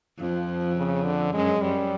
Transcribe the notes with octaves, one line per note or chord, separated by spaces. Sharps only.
F2 F3
C#3
D3
F#2 G#3
F#2 G3